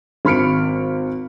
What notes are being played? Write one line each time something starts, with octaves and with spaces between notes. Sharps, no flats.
G#1 B5 F6 C#7 D7